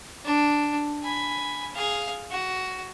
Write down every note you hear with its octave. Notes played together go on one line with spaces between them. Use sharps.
D4
G#5 B5
G#4 F5
F#4